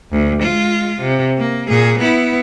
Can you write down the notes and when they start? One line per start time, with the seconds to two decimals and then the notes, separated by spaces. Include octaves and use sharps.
0.12 D2
0.42 G#3 F4
1.00 C3
1.38 A#3
1.69 A#2 G#4
1.99 B3 E4